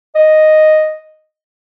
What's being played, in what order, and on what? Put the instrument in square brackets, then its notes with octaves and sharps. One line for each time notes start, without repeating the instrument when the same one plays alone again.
[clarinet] D#5